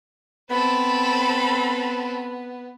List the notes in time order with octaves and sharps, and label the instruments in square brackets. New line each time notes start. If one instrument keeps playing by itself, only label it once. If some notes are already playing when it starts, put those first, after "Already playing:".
[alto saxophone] B3 [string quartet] C4 A4 [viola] B5